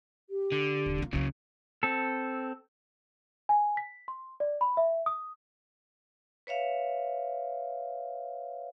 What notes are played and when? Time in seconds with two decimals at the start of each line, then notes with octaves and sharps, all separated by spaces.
0.30 G4
0.52 D3
0.86 D#1
0.98 A#3 F4
1.13 C#2 C#3 F#3 A#3
1.83 C4 A4
3.49 G#5
3.77 B6
4.08 C6
4.40 D5
4.61 B5
4.77 E5
5.06 D#6
6.47 B4 C#5 E5 F5